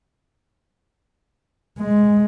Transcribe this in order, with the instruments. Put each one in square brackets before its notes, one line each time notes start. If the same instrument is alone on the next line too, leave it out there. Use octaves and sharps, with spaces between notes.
[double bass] G#3